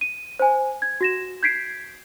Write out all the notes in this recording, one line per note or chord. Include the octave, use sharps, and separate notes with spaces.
D#7
C5 G#5
G#6
F#4 A#6 E7
G6 G#6 B6 C7 D7